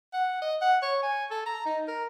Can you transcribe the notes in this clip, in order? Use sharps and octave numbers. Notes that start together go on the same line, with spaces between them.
F#5
D#5
F#5
C#5
G#5
A4
A#5
D#4
A#4